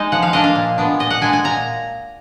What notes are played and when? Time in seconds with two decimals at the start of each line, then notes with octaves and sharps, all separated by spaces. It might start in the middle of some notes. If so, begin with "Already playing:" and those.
Already playing: G#3 D#4 D#5
0.12 F3 F#5
0.22 F5
0.33 A#3 D4 D#5
0.44 F5
0.56 A#2
0.78 G#3 B3 D4
0.99 A#2 D#5
1.10 F#5
1.21 G#3 D4 G#5
1.33 G#5
1.44 A#2 A#5